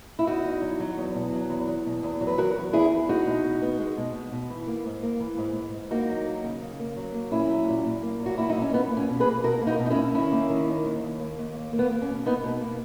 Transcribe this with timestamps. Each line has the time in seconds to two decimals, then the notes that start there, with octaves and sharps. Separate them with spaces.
0.19 E4
0.27 E2 D#4 F#4
0.44 E2
0.62 F#3
0.80 F#3
0.98 E2
1.15 B2
1.33 F#3
1.50 E2
1.68 E2
1.85 B2
2.03 E2
2.21 F#3
2.27 B4
2.38 E2 F#4 A#4
2.56 E2
2.73 E2 E4 G#4
2.91 E2
3.09 G#3 D#4 F#4
3.27 B2
3.44 B2
3.62 B3
3.80 G#3
3.97 B2
4.14 B2
4.32 B2
4.50 E3
4.67 A#3
4.85 G#2
5.03 A#3
5.20 E3
5.38 G#2
5.56 G#2
5.73 G#2
5.91 A#3 D#4 F#4
6.09 F#3
6.26 A#3
6.44 C#3
6.61 C#3
6.79 A#3
6.96 F#3
7.14 A#3
7.32 A#2 C#4 E4
7.50 F#3
7.68 A#2
7.85 A#2
8.03 A#3
8.20 F#3
8.26 F#4
8.38 A#3 E4
8.50 D#4
8.55 A#2
8.61 C#4
8.73 A#3 B3
8.91 A#3
8.97 C#4
9.08 B2
9.20 G#4 B4
9.26 A#3
9.44 B2 F#4 A#4
9.61 A#3
9.67 D#4 F#4
9.79 B2
9.86 D#4
9.90 C#4 E4
9.96 A#3
10.14 D#3 C#4 E4
10.32 A#3
10.49 D#3
10.67 D#2
10.85 D#2
11.02 D#2
11.20 A#3
11.38 D#2
11.55 A#3
11.73 A#3
11.79 B3
11.91 A#3
12.02 C#4
12.09 B2
12.26 A#3 B3 D#4
12.44 B2
12.61 A#3